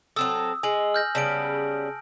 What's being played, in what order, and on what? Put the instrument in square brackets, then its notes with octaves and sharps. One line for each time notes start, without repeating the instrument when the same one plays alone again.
[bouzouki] F#3 C4 A4 [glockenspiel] D#6 E6
[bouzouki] G#3 [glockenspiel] G#5 F#7
[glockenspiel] F6 G6 A#6
[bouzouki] C#3 G3 B3 [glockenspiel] A5 D7